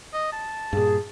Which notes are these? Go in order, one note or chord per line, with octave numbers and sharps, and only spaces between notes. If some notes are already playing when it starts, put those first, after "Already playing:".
D#5
A5
G2 A#2 G#4